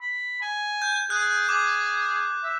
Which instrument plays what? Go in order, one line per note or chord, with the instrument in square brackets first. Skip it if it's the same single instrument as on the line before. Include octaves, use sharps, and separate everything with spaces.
[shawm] B5
G#5
[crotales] G6
[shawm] G#4 [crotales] F#6
[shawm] G#4 [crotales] D6
[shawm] E5